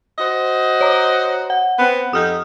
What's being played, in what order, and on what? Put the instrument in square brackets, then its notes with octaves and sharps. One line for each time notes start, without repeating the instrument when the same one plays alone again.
[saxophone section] F#4 C5 D#5
[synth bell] C#5 A#5
F#5
[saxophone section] B3 C4
[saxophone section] F2 D#4 G4 [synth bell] D#6 F6 G6